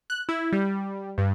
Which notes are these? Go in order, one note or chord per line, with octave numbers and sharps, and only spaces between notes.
F#6
E4
G3
G2